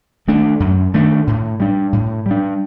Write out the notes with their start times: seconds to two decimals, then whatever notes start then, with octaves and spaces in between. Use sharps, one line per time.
0.28 D#3 A3 D4
0.60 F#2
0.94 D#3 A3 D4
1.27 A2
1.60 G3 D4
1.93 A2
2.26 G3 D4